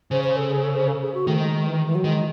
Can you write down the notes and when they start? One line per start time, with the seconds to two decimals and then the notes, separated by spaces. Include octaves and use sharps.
0.11 C#3 C5
0.24 C5
0.37 A4
0.50 G#4
0.63 A4
0.75 C5
0.88 A4
1.02 G#4
1.14 F#4
1.27 D#3 A3
1.40 G#3
1.53 G#3
1.66 E3
1.86 E3
1.95 F#3
2.04 D#3 G#3